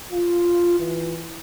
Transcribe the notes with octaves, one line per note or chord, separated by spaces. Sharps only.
F4
E3